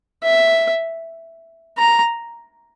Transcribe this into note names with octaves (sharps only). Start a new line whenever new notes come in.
E5
A#5